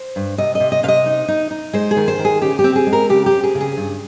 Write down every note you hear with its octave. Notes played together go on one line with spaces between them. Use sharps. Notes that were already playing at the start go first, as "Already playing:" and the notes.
Already playing: C5
G2
C3 D#5
D#5
C3
D#5
C3 F5
D#5
D#4
D#4
D#4
G#3 C5
G#4
D#3
C5
D#3
G#4
C#3 G4
G4
C4
G#4
G#3
A#4
C#3 G4
G4
C4
G#4
C#3
G#4
G2